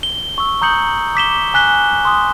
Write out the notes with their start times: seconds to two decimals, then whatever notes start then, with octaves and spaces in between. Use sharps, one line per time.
0.03 G7
0.38 C#6 E6
0.62 A#5 D#6 G6 C#7 F#7
1.15 D6 B6 E7 G7
1.54 G#5 F#6 B6 G7
2.05 C6 D#6